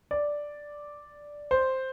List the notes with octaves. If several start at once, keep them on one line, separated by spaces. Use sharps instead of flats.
D5
C5